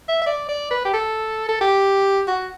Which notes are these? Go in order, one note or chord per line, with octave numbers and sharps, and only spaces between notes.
E5
E5
D5
D5
B4
G4
A4
A4
G4
F#4